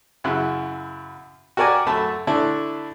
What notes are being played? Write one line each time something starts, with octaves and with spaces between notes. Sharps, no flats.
F#2 C#3 E4 F#6
F#4 G4 A#4 D5 G#5
F#2 A3 A5 B5
D3 A3 D4 E4